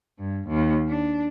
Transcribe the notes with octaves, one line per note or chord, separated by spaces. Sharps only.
G2
D#2
D4